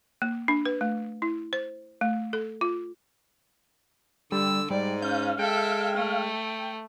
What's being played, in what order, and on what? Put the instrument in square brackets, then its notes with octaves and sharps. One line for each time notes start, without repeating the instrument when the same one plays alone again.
[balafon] A#3
D4
B4
A3
E4
C5
A3
A4
F4
[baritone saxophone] D3 [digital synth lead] G3 [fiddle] E6
[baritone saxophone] G#2 [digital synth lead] G3 [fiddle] D5
[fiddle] C#4 [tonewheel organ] F5 [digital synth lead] G6
[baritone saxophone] G#3 [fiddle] A4 E5 [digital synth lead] G5
[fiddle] A3